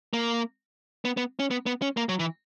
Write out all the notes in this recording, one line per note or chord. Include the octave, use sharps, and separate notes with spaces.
A#3
B3
B3
C#4
B3
B3
C#4
A#3
F#3
E3